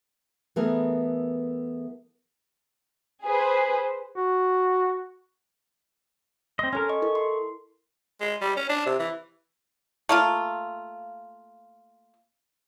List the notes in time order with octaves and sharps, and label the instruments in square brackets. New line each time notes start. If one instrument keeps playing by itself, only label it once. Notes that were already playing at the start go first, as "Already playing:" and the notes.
[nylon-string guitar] E3 A3 B3 G#4 A#4
[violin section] G#4 B4 C5
[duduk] F#4
[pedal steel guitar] C4 D#5 [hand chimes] C6
[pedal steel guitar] C#4 A#4 [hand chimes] A4 G#5
[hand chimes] D#5 [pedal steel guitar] C#6
[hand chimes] E4 A4 A#4
C6
[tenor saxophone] G#3
G3
C#4
D4
C3
E3
[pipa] A3 A#3 F4